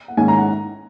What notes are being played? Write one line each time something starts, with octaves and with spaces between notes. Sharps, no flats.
F#5
G#2 D#3 G#3 C#4 G#5
A#5
F#5